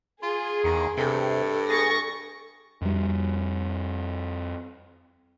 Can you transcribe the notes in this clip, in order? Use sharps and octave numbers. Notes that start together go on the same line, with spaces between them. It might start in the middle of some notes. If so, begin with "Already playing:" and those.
F4 G#4
E2 D#3
G2 C3 A4
G#4 C#6 A6 A#6
F2 G3